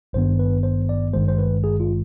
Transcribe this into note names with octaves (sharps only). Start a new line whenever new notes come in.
G#1 G2 D#3 B3 C5
B4
C5
D5
G#1 G2 D#3 G#3 C5
C5
B4
G#4
F4